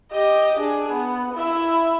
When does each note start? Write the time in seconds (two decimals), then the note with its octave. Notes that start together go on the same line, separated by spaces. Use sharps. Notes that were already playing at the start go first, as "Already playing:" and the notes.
0.11 G4 D#5
0.60 D4 G#4
0.92 B3
1.34 E4 E5